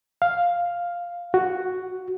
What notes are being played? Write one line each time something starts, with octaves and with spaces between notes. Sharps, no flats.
F5
F#4